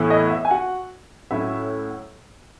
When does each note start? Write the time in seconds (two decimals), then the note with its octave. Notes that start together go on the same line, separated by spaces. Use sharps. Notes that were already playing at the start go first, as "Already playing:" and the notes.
Already playing: A2 E3 B3 E4
0.10 D#5
0.30 E5
0.45 G#5
0.51 F#4 F#5
1.31 A2 F#3 C#4 E4 E5